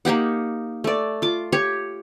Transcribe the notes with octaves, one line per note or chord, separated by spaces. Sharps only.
A#3 D#4 G4 F#5
A3 D5
F4 D6
G4 C#5 C#6